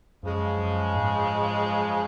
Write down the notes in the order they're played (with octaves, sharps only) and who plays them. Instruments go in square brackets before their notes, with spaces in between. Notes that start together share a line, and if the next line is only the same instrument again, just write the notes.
[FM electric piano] F#2 [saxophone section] C#3 F3 G#3
[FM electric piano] F#2
G#2